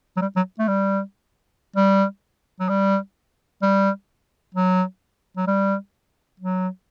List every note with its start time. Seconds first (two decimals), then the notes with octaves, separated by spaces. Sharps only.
0.17 F#3
0.21 G3
0.36 F#3
0.59 A3
0.68 G3
1.76 G3
2.60 F#3
2.69 G3
3.62 G3
4.55 F#3
5.37 F#3
5.47 G3
6.40 F#3